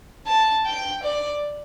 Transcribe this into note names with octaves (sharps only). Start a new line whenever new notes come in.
A5
G5
D5